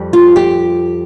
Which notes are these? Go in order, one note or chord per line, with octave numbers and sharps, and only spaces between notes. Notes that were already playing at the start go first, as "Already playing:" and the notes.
Already playing: F2 G3
F4
G4